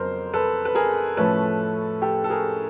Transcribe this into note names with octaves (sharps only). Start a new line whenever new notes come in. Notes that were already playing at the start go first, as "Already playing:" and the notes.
Already playing: F2 C#3 F#3 B3 A#4 C5
A4 B4
B4
G#4 A#4
A2 F3 A3 C#4 A4 B4
G4 A4
A4
G#4 A#4